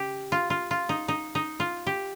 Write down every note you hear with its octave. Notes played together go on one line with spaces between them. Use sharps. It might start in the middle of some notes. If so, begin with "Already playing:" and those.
Already playing: C#3 G4
F4
F4
F4
D#4
D#4
D#4
F4
G4